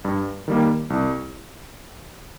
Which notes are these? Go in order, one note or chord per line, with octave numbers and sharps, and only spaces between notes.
G2
D#3 G3 A#3
C2